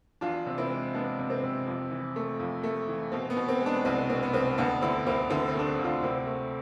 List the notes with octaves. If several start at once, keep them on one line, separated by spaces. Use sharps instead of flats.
E2 D4 F4
C3
C4 E4
G#3
G#3 B3 D4
C3
C4
C3
F2
E3
A3
F2
A3
E3
B2 C4
B3
B2
C4
G#3
B3 D4
C2 C4
B2 C4
B3
C2 C4
D2 B3 D4
D3 C4 E4
D2 C4 E4
D3 C4 E4
C4 E4
A3 D4
C4
D2
D4 F4
C3 C4 E4
A3